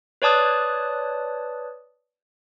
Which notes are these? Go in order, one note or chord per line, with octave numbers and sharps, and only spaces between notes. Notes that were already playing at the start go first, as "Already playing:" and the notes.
B4 C#5 D5 A5 D#6 F#6